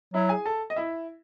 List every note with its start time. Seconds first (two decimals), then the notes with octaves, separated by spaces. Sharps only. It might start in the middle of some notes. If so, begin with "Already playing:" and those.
0.14 F#3 E4 E5
0.29 G#4 G#5
0.45 A4 A5
0.70 D#5
0.76 E4 E5